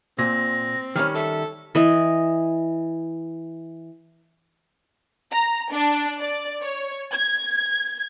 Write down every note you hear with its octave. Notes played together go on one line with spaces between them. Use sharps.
A#2 C4 A#6
D#3 G3 C#4 F6
A4 E5
E3 D#5
A#5
D4
D5
C#5
G#6